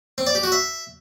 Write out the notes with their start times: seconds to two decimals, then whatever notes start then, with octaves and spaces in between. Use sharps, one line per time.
0.18 C4
0.26 D5
0.35 G4
0.43 F#4
0.52 E5